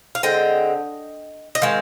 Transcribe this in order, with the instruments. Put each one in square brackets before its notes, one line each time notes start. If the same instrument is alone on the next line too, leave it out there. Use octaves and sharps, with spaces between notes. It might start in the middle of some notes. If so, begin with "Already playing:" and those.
[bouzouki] F5
D3 G#3 C4 D#5 G5
D#5
D#3 G#3 C4 F5